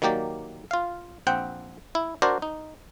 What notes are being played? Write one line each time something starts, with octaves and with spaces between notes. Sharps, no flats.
D#3 F#3 A#3 G4 D5
F4 F5
A#1 C4 F#5 G5
E4
D4 F#4 A#4 C5 D5
D#4